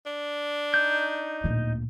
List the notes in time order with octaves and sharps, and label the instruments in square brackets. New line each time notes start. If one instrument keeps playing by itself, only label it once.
[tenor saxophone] D4
[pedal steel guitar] D#4 G6
[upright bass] D1 A#2